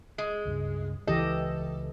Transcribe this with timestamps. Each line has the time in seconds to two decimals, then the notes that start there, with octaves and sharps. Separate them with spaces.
0.18 G#3
0.45 C#2 G2 C#3
1.07 C#2 E3 G4 A4 D#5